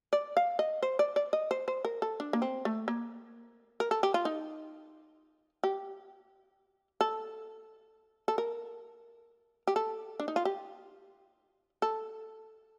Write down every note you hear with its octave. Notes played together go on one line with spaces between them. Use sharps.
D5
F5
D#5
C5
D5
D5
D#5
C5
C5
A#4
A4
D4
A#3
C4
A3
A#3
A#4
A4
G4
F4
D#4
G4
A4
A4
A#4
G4
A4
D4
D#4
F4
G4
A4